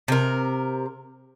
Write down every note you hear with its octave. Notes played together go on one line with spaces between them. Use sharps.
C3 A#4